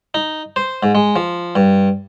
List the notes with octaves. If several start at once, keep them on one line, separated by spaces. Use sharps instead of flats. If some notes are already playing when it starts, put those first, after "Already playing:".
D#4
C5
G#2
G#3
F3
G2